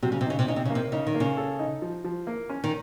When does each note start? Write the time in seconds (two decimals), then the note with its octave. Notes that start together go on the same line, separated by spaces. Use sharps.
0.03 C3 F#3
0.12 C#3
0.21 C3
0.26 C#3 D#4
0.39 C3
0.48 C#3 D#4
0.56 C3
0.65 C#3
0.70 A#3
0.75 C3
0.92 C#3 D#4
1.07 D#3
1.15 A#3
1.20 C#3
1.37 A4
1.59 D#4
1.82 F3
2.04 F3
2.27 A#3
2.49 C#4
2.64 D#3